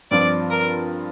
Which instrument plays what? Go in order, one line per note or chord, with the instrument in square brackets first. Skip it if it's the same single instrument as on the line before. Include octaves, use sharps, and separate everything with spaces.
[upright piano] G2 F3 C4 F4 [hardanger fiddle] D5
[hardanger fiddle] A#4